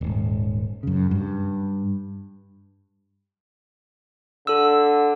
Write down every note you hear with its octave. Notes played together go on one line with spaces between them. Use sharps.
D#1 G#2
F#2 C#3
G2
D3 A4 E6